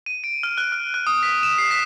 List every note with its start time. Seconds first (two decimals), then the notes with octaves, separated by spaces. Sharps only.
0.06 D#7
0.24 D7
0.43 F6
0.58 F#6
0.72 F6
0.94 F#6
1.07 D#6
1.23 B6
1.43 E7
1.58 C7
1.71 B6